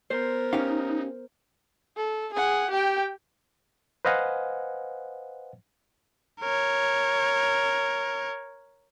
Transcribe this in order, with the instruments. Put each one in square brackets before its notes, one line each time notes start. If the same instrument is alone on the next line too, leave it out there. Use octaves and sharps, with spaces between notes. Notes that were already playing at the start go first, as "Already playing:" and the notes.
[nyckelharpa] B3 A#4 [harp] C5
[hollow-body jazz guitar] C#4 G4 F5 [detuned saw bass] D#4
[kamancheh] A4
G#4 F#5
G4 G5
[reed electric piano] B4 C5 D#5 F5 F#5 G#5
[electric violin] A#4 C#5